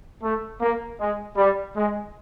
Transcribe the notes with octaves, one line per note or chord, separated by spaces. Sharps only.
A3
A#3
G#3
G3
G#3